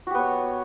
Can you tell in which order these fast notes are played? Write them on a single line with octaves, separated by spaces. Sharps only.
F#4 G4 B3 C#5